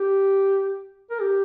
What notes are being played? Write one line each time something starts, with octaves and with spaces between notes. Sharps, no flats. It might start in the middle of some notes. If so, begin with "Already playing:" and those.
Already playing: G4
A#4
G4